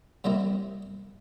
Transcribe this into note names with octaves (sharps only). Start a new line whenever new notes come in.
C3 G3 A#3 C4 D#4 E4